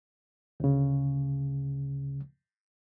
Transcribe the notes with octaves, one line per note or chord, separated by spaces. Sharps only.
D2 C#3